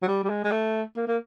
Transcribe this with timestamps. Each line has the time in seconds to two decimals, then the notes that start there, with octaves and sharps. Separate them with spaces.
0.02 F#3
0.07 G3
0.23 G3
0.29 G#3
0.44 G#3
0.51 A3
0.96 A#3
1.07 A#3